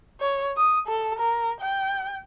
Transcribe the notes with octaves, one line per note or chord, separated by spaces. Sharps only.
C#5
D#6
A4
A#4
G5